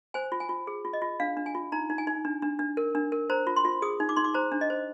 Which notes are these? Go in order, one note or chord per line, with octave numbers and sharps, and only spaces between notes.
C5 G#5
F4
G#5
F4
G#4
F4
D#5
F4
D4 F5
D4
G#5
F4
D#4 A#5
D#4
G#5
D#4
D4
D4
D4
A#4
D4
A#4
C5 A#5
F4
C6
F4
G#4 D#6
D#4
D6
D#4 C6
D6
C5 A#5
D4
D#5
C5